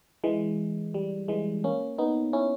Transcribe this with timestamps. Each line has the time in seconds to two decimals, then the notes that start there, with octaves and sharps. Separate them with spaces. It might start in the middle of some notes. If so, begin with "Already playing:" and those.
0.24 E3 G#3
0.94 G3
1.28 E3 G#3
1.64 A#3 C#4
1.98 B3 D#4
2.33 C#4 E4